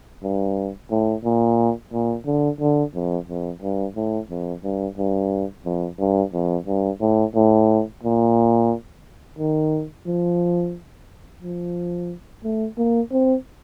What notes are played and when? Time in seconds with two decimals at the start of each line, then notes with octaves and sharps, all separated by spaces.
0.23 G2
0.91 A2
1.24 A#2
1.92 A#2
2.26 D3
2.60 D3
2.94 F2
3.28 F2
3.62 G2
3.96 A2
4.30 F2
4.63 G2
4.97 G2
5.65 F2
5.99 G2
6.33 F2
6.67 G2
7.01 A2
7.35 A2
8.03 A#2
9.38 D#3
10.06 F3
11.42 F3
12.44 A3
12.78 A#3
13.12 C4